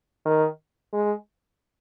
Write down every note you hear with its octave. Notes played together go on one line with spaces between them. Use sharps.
D#3
G#3